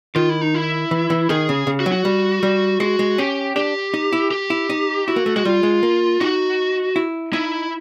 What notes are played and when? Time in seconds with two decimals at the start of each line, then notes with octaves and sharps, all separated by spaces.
0.16 D#3 F4
0.29 E4
0.41 D#4
0.54 E4
0.91 E3
1.10 E3
1.29 D#3 G#4
1.49 C#3
1.67 C#3
1.80 F#4
1.86 F#3
1.92 F#4
2.05 G3
2.43 G3
2.80 G#3 F#4
2.99 G#3
3.18 C#4 G4
3.56 D4 G4
3.94 D#4
4.12 E4
4.31 G4
4.50 E4
4.70 D#4
5.08 E4 F#4
5.16 A#3
5.26 A3
5.36 G#3 F#4
5.45 G3 F4
5.63 G#3
5.83 A#3
6.20 D#4 F#4
6.96 E4
7.33 D#4 E4